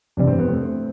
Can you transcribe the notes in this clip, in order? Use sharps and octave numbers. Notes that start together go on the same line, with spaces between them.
G1 F2 C3 E3 G3 D4
C4
B3
A3 C4